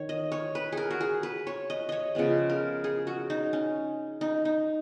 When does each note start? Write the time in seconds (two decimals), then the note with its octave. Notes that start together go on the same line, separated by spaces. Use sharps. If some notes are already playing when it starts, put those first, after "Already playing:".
Already playing: D#3 C#5
0.09 D#5
0.32 C#5
0.55 B4
0.72 G#4 A#4
0.91 F#4
1.01 G#4
1.23 B4
1.47 C#5
1.70 D#5
1.89 C#5 D#5
2.15 C#3 F3 G#3 B3
2.50 A#4
2.84 G#4
3.07 F#4
3.30 D#4
3.53 C#4
4.21 D#4
4.45 D#4